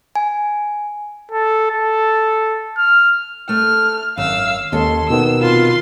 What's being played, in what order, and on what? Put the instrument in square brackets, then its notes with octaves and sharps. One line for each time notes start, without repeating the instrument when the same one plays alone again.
[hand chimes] G#5
[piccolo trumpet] A4
A4
F6
[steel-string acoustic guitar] A3 E5 [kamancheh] F6
[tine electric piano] G#1 [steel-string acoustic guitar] F#2 [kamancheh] F5 E6
[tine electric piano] D#2 [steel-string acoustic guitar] G#3 C#4 A4 [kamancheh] C6
[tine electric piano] B2 D#3 B3 [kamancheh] E6
[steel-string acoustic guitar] C3 B4 [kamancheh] F4 C6